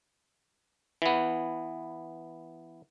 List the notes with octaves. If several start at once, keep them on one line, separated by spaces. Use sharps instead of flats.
E3 B3